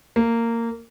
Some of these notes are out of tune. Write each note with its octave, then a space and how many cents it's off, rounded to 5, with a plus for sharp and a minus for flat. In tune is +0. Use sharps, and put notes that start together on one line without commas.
A#3 -15